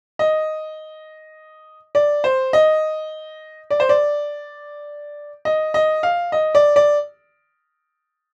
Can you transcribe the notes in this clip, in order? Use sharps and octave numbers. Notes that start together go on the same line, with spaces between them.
D#5
D5
C5
D#5
D5
C5
D5
D#5
D#5
F5
D#5
D5
D5